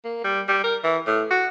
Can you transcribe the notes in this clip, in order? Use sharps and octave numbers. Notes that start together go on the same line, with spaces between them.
A#3
G3
G3
A#4
E3
A2
F#4